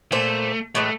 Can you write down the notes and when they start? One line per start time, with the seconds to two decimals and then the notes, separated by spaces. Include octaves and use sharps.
0.12 A#2 A3 C5
0.75 A2 E3 G#3 A3